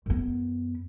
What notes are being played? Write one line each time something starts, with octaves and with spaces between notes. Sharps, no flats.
F#2 B3